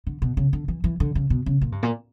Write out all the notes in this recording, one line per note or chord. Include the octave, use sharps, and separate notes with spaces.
D3
B2
C#3
D3
E3
E3
D3
C#3
B2
C#3
A#2
G2
A#2